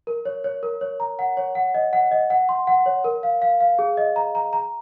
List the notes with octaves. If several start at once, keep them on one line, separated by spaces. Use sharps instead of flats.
A#4
C#5
C#5
A#4
C#5
A#5
F#5
C#5
F#5
D#5
F#5
D#5
F#5
C6
F#5
C#5
A#4
F5
F5
F5
G#4
D#5
A#5
A#5
A#5